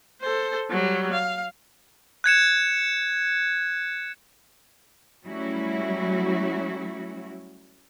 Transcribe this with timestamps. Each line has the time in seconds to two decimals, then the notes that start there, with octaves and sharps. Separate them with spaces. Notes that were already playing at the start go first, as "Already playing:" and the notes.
0.22 A4 C5
0.70 F#3 G3
1.12 F5
2.24 F#6 G#6 C#7 E7
5.24 F#3 G3 A3 C#4 E4 F#4